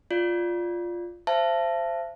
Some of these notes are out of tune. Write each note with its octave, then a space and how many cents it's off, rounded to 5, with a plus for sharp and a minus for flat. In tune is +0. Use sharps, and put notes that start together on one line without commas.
F4 +0 D5 +0
C5 +0 E5 +45 A5 +0